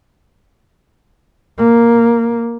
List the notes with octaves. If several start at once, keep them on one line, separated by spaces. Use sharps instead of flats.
A#3